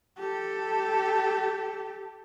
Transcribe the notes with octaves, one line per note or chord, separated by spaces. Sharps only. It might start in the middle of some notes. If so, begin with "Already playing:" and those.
G4 A4